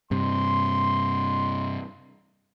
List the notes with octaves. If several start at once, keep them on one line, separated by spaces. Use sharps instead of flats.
G2 C3 C6